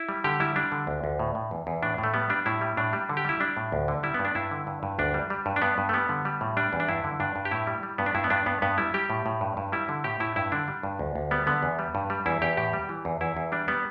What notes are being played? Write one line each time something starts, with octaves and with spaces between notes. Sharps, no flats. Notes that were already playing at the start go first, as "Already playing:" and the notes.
Already playing: E4
G3
D3 G4
G3 E4
G3 D4
D3
D2
D2
A2
A2
E2
E2
A2 D4
A2
A3
G3 B3
G3 D4
A2 E4
G3
A2 D4
G3
D3
G4
G3 E4
G3 D4
A2
D2
D3
G3 E4
G2 B3
D4
G2 E4
D3
G2
G2
D2 D4
G3
G3
G2
D4
G2 B3
G2
A3
G3 B3
D3
G3
A2
G3 D4
E2
D4
G2 E4
D3
G2 D4
G2
G4
A2 E4
G3
G3
G2 B3
D4
G2 E4
B3
G2 D4
G2 B3
G2 B3
G3 E4
G3 G4
A2
A2
G2
G2
G3 E4
D3
A2 G4
A2 E4
G2 E4
D3 D4
G3
G2
D2
D2
G3 B3
D3 B3
E2
G3
G2
G3
E2 E4
E2 G4
A2 G4
G3
E3
E2
E2 E4
E2
G3 D4
G3 B3